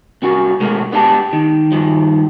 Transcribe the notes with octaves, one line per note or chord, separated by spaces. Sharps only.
C2 C#4 F#4 A#4
B2 G#3 A3 A#4
B3 D4 G4 F5 A5
D#3
G2 D#3 F3